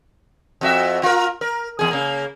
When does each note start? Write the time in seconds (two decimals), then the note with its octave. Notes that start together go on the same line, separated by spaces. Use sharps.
0.61 F2 F#4 E5
1.03 F4 A#4
1.41 A#4
1.79 E2 G#4
1.91 C#3 A#3